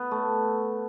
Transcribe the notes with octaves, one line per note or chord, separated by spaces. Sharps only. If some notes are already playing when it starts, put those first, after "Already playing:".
Already playing: B3
A3